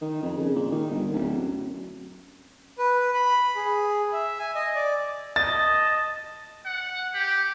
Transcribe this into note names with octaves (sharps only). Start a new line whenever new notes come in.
D#3
F2
C#3
A#2
D#3
G1
D1
F#2
B4
B5
G#4
E5
G#5
D#5
D5
D#5 A5 A6
F#5
G4